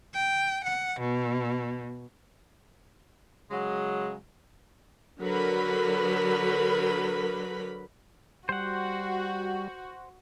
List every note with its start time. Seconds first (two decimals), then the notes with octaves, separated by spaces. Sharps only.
0.14 G5
0.64 F#5
1.00 B2
3.51 C#3 F#3 G#3
5.21 D3 F#3 A#4 B4 B5
8.49 G3 F#4 C5 F#5